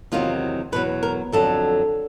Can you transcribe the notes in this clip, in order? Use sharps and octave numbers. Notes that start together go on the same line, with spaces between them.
E2 C3 D#3 F#3 F4
E2 B2 F#3 B4
A#4
F2 D3 F#3 A4